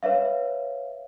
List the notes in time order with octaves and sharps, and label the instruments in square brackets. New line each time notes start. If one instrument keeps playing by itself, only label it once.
[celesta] B4 C#5 E5 F5